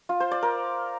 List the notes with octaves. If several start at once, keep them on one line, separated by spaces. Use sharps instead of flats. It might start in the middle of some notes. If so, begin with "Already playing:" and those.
F4
C5
D5
A#4